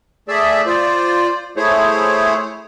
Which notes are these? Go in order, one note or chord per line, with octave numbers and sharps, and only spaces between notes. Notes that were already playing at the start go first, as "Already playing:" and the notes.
A3 G#4 D5 E5
F4 C5 D5
A3 E4 G#4 C5 C#5